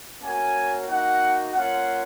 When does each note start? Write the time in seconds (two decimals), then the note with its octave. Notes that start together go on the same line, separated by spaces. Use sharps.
0.21 A#3 C#4 F#4 G#5
0.87 A#3 D#4 F#4 F#5
1.54 A#3 C#4 F4 F#5